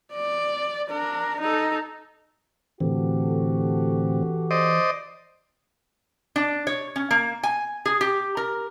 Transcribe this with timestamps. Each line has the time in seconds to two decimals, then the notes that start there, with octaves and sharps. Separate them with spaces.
0.14 D5
0.90 D4 A#4
1.40 D#4 A4
2.80 A2 D3 E3 C4 F#4 G4 A4
4.51 C5 D5 D#5
6.36 D4
6.67 C#5
6.96 C#4
7.11 A#3
7.43 G#5
7.86 G#4
8.01 G4
8.37 A#4